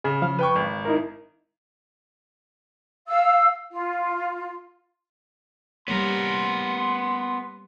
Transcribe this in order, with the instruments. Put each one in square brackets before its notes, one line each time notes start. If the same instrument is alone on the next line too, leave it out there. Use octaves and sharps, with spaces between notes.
[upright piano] C#3 [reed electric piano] G#4
[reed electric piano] F3 F5
[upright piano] B4 G5 C#6
G#1
[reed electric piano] D#4 E4 A#4
[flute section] F5 E6
F4
[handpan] G3 A#3 C#5 [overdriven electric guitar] B3 A#4 [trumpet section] C6